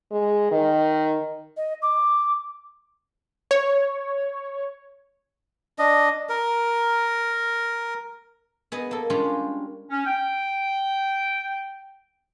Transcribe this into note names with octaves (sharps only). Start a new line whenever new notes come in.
G#3
D#3
D#5
D6
C#5
D4 D#5
A#4
B3 G#4 D#5
A#3 A4
G3 G#3 C#4 D4 F4 G4
C#4
G5